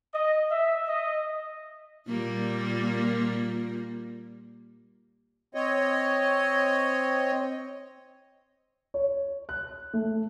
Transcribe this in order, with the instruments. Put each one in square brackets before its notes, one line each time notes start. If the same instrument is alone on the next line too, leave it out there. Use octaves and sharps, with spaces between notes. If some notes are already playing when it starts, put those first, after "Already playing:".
[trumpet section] D#5
E5
D#5
[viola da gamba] A#2 G3 A#3
[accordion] C4 C#5 D#5
[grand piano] C#5
F#6
A3